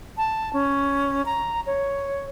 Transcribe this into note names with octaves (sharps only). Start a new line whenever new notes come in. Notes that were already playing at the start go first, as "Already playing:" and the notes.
A5
C#4
A#5
C#5